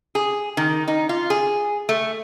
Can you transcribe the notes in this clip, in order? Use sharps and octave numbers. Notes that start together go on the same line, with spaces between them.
G#4
D#3
D#4
F4
G#4
A3